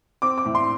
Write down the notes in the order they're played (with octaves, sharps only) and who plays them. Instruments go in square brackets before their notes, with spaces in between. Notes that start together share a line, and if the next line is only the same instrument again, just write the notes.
[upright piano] C4 D6
D6
A2
C6